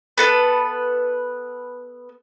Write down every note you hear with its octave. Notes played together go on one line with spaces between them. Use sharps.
B3 A4 B4